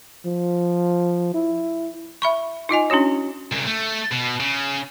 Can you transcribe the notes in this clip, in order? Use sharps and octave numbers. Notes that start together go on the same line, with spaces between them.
F3
E4
E5 B5 C#6
D#4 F4 D#5 G#5
C#4 D4 E4 F#4 C#5
C2 C#3
A3
B2
C#3